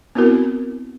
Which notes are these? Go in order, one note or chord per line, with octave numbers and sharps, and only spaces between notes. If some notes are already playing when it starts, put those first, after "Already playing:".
B3 C4 E4 F#4 A#4